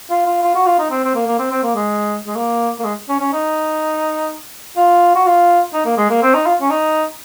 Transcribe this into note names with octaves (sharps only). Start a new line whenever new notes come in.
F4
F4
F4
F#4
F4
D#4
C4
C4
A#3
A#3
C4
C4
A#3
G#3
G#3
A#3
A#3
G#3
C#4
C#4
D#4
F4
F#4
F4
D#4
A#3
G#3
A#3
C4
D#4
F4
C#4
D#4